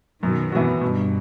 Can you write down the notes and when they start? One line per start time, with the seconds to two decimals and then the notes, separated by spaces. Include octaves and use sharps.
0.22 F#2 B2 D#3
0.52 B2 E3 B3 F#4
0.81 G2 B2